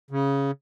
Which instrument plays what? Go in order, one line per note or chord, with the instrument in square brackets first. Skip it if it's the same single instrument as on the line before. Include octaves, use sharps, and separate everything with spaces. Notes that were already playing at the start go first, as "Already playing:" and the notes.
[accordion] C#3